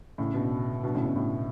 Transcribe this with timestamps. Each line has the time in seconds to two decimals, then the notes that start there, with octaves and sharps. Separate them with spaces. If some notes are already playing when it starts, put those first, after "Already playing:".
0.18 A2 C#3
0.34 B2 D3
0.83 G2 B2
0.94 A2 C#3
1.05 G2 B2
1.16 A2